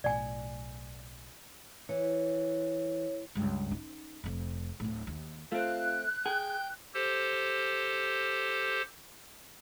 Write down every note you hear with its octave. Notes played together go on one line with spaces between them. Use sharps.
B1 A2 D5 G#5
E3 C#5
C#2 G2
C#4 D#4
F1 F2
D1 A2
D#2
A3 C4 F4 F#6
G#4 G5
G4 A4 C5